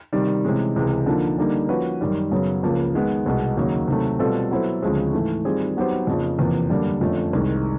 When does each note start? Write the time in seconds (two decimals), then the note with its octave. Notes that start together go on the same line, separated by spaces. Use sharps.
0.13 C3 D#3 G3
0.44 C3 E3 G#3 C#4
0.76 C#2 C3 E3 G#3
1.06 D3 F3 A#3 D#4
1.38 D3 G3 A#3 D#4
1.69 F3 A#3 C#4 F#4 B4
2.01 F#2 D#3 G3
2.31 F#2 C#3 F#3 B3
2.63 C#2 C#3 F3 A#3
2.94 D#3 G#3 B3
3.26 C2 B2 G#3 B3
3.57 D#2 C#3 F#3 A#3 D#4
3.88 C3 D#3 F#3 A3
4.19 B2 G3 C4 F4 A4
4.50 F#3 B3 E4 A4 C5
4.82 D2 C#3 F3 G#3 C4
5.13 G#2 E3 A3
5.45 D#3 G3 C4 F4 G#4
5.77 F#3 B3 D#4 G4 C5
6.07 F2 C#3 F3 A#3
6.38 E2 C3 F3 A#3
6.70 F#2 D3 G3 A#3
7.01 F2 D3 F3 A3 C#4
7.33 C2 C3 D#3 G#3